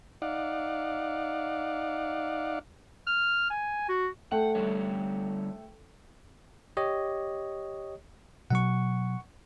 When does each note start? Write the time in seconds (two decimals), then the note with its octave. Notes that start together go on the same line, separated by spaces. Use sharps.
0.22 D#4 D5 F5 F#5
3.07 F6
3.50 G#5
3.89 F#4
4.32 A3 A4 F#5 G5
4.55 D3 G3 C#5
6.77 G4 C#5 D#5
8.50 B2 F#3 F#5 C#6